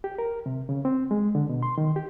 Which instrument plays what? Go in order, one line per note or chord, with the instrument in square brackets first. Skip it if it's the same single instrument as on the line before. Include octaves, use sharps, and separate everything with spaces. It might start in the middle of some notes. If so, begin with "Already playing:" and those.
[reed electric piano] G4
A#4
C3
C#3
C4
G#3
D3
B2
C6
D#3
G4